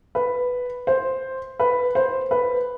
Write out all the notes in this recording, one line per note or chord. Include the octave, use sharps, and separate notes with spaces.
B4
C5
B4
C5
B4